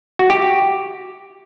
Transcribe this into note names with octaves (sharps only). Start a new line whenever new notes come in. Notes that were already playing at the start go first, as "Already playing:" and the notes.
F#4
G4